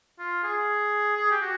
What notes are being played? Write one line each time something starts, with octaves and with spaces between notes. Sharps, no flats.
F4
G#4
G#4
G4
F#4